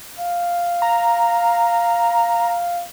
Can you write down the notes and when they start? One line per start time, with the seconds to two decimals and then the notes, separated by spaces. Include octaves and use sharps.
0.19 F5
0.82 A#5